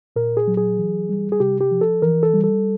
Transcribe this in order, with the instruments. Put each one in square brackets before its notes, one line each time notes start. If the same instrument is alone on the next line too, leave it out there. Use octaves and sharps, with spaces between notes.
[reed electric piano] A#2 A#4
G#4
F#3
G#4
E3
G3
G#4
C3 G4
G4
F3
A4
E3 A#4
A4
G3
A4